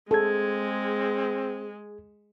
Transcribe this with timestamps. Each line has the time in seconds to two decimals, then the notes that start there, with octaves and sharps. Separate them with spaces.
0.11 G#3 C4 G#4 A4 G#6